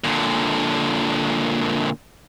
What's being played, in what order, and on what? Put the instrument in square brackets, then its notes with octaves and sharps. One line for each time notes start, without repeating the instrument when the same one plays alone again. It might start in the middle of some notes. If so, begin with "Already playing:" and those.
[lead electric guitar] A#2 D3